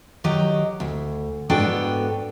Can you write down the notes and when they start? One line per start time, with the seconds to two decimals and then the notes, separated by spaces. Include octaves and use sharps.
0.24 D#3 F#3 G4 D#5
0.80 D2
1.50 G#2 B3 D4 F#4 A4 G5